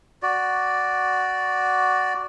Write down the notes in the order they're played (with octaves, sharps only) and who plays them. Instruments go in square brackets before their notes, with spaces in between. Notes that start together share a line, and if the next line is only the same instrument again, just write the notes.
[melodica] F#4 D5